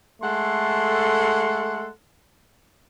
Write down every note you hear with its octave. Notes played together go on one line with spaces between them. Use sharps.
G#3 A3 A4 F#5 C6